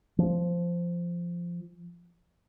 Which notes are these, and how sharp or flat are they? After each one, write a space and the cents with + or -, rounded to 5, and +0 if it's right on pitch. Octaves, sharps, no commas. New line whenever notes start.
F3 -10